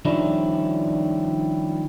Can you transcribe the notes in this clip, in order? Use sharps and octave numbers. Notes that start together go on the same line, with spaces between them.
D#3 F3 G3 C#4 D4 E4